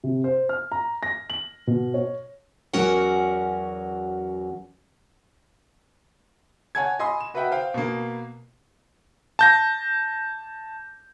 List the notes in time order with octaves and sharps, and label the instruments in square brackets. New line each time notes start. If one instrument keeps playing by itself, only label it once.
[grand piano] C3
C5
F6
A#5
A#6
F#7
B2
C#5
[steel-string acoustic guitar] E2 F#3 C#4 F#4 A#4 F#5
[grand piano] C#5 F#5 G#5 A5 G#6
D#5 G#5 B5 C6 D#6
E7
F#4 B4 D#5 E5 F#5 G5
C5 F5 G5
B2 A#3
[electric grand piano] A5 G6 A#6